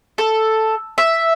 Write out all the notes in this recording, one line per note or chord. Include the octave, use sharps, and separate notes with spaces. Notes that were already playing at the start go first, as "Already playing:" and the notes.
A4
E5